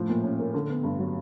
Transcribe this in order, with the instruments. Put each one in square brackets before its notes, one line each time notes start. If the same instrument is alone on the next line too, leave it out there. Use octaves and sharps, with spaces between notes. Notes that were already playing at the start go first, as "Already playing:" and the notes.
Already playing: [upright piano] A2 F3
A#2
C#4
A#3
D3
B3
G2
F#3